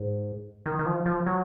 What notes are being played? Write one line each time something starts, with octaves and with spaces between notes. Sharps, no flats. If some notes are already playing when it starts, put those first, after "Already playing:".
Already playing: G#2
D#3
D#3
F3
F3
F#3